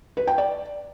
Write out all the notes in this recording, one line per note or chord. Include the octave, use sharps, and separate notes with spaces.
B4
G5
D5